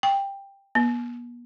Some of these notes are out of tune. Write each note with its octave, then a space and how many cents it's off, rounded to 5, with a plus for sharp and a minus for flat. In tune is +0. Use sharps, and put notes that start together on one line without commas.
G5 +10
B3 -45